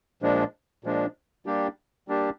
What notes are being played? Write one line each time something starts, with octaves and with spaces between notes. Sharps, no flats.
A#2 F3 G#3 D4
A#2 F3 G#3 D4
G3 A#3 D4 G4
G3 A#3 D4 G4